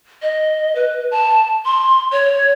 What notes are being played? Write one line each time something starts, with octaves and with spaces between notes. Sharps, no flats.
D#5
B4
A5
C6
C#5